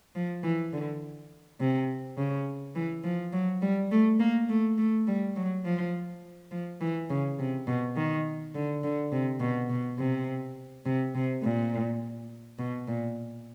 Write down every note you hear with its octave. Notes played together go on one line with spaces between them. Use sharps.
F3
E3
D3
C3
C#3
E3
F3
F#3
G3
A3
A#3
A3
A3
G3
F#3
F3
F3
E3
C#3
C3
B2
D#3
D3
D3
C3
B2
B2
C3
C3
C3
A#2
B2
A#2